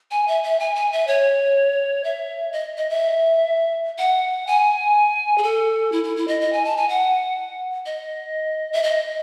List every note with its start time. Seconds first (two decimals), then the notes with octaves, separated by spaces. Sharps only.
0.11 G#5
0.28 E5
0.43 E5
0.60 G#5
0.75 G#5
0.92 E5
1.07 C#5
2.04 E5
2.53 D#5
2.77 D#5
2.90 E5
3.98 F#5
4.47 G#5
5.38 G#4
5.43 A4
5.92 E4
6.04 E4
6.17 E4
6.28 D#5
6.41 D#5
6.53 G#5
6.65 A5
6.77 G#5
6.89 F#5
7.86 D#5
8.73 E5
8.83 D#5